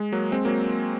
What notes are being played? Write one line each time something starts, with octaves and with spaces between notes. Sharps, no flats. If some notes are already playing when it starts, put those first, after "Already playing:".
Already playing: G#3
F#3 A#3
G#3 C4
F#3 A#3